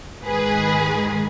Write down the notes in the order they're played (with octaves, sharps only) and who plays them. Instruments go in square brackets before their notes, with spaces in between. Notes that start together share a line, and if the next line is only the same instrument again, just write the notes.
[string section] G#2 D#3 G#3 G#4 B4